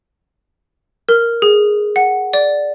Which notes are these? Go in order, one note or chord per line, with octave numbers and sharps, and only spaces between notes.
A#4
G#4
F#5
D5